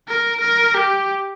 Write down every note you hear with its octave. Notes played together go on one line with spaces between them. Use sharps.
A#4
A#4
G4